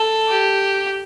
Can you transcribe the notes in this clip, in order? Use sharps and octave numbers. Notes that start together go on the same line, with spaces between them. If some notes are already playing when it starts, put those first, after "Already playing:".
Already playing: A4
G4